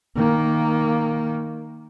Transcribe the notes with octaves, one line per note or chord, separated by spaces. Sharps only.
D#3 A#3